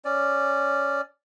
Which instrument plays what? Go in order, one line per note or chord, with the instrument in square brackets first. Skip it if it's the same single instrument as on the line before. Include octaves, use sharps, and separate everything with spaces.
[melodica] C#4 D5